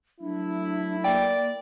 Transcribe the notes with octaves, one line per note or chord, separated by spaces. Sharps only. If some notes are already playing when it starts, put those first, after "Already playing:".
F#3 A3 D4 E4
A#3 D5 G5